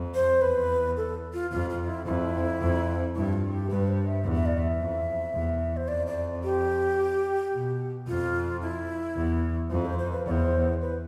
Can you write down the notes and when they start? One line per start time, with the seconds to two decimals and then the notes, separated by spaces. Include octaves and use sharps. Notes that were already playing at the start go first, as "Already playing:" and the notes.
Already playing: F2
0.15 C5
0.41 E2 B4
0.97 A4
1.33 F4
1.51 F2 F4
1.70 F4
1.87 E4
2.05 F2 E4
2.61 F2
3.15 G2 E4
3.33 F4
3.52 G4
3.70 G2 B4
3.87 C5
4.06 E5
4.24 E2
4.35 E5
4.45 D5
4.57 E5
4.80 F2
5.34 E2
5.77 C5
5.88 F2 D5
6.07 D5
6.44 G4
7.53 B2
8.07 F2 F4
8.62 E4
9.16 E2
9.71 F2 F4
9.85 C5
9.99 C5
10.12 B4
10.26 E2 C5 D5
10.81 B4